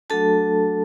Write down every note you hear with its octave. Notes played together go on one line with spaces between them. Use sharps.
F#3 A3 D4 F#4 A4 A5